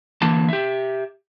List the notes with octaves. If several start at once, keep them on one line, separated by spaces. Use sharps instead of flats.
D3 E3 A#3 A5
G4 E5